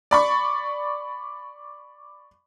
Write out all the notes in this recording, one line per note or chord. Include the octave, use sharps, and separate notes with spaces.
D5 B5 C#6